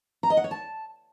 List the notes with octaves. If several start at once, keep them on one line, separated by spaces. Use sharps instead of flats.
A#5
D#5
F#5
C#5
A5